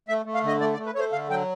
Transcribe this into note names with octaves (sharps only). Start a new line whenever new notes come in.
A3 E5
A3
F5
D3 D#5
A3 D5
D5
A3
B4
A3 C#5
C5
D3 F5
F#3 G5